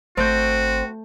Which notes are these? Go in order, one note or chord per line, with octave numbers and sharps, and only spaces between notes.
G#1 A3 C4 F#4 G6